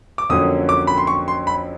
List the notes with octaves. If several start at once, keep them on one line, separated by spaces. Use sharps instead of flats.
D6
F2 D3 F#3 A#3 C#4 D#6
D6
B5
C6
C#6
C6
B5